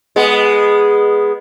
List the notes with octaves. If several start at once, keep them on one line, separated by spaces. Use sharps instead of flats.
G#3 B3